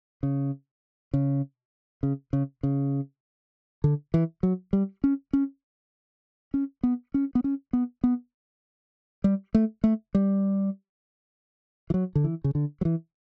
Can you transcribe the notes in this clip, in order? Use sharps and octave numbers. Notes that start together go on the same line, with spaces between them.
C#3
C#3
C#3
C#3
C#3
D3
E3
F#3
G3
C#4
C#4
C#4
B3
C#4
B3
C#4
B3
B3
G3
A3
A3
G3
E3
F#3
D3
E3
C#3
D3
F#3
E3